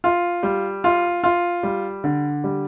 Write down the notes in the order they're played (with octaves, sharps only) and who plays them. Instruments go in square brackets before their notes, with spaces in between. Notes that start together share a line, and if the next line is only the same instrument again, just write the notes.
[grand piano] F4
G3
F4
F4
G3
D3
G3